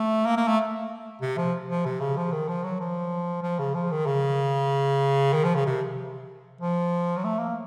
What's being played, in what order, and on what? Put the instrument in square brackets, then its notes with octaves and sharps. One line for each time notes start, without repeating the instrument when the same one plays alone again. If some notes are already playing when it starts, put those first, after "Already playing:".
Already playing: [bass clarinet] A3
A#3
A#3
A3
C3
F3
F3
C3
C#3
F3
D#3
F3
F#3
F3
F3
C#3
F3
D#3
C#3
D#3
F3
C#3
C3
F3
F#3
A3
A#3